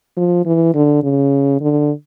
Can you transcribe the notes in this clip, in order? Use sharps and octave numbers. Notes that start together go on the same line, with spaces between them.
F3
E3
D3
C#3
D3